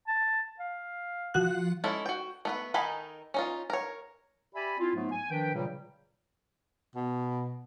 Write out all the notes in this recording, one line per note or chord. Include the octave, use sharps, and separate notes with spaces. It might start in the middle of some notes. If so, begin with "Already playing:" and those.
A5
F5
F3 F#4 F#6
G#3 C#4 E4 A4
F#4 G5
A3 B3 B4
D#3 D#4 A4 G#5 B5
C#4 D#4 F4
A#4 C#5
G4 D5 E5 G#5 B5
C4 E4 F4
G#2 F#3 A3 B3 F4
G#5
D#3 F3 D4 B4 G5
A#2 C#3 E3 F#3 G3
B2